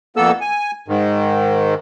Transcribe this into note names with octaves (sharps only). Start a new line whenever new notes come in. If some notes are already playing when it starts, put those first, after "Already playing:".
F2 A#3 B3 A4 E6
G#5
G#2 D#3